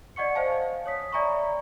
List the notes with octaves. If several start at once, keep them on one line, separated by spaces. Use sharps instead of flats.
D5 D#5 F#5 C#6 C#7
C5 D#5 F5 G#5 A5
C#5 D#6 B6
D5 E5 G#5 A#5 B5 C#6